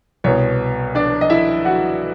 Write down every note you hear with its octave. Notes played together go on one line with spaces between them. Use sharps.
C2 B2 C#5
D4 D5
D#5
E4 E5
F#4 F#5